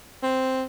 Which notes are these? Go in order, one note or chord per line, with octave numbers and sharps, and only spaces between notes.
C4